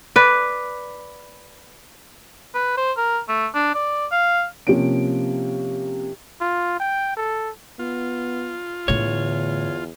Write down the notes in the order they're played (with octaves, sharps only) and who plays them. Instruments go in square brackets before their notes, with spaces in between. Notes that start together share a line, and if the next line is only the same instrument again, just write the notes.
[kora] B4 D5
[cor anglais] B4
C5
A#4
A3
D4
D5
F5
[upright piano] C3 F3 A#3 C#4 D7
[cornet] F4
G5
A4
[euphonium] B3 [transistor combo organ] F4
[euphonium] E2 [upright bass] A2 D3 [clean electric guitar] C#5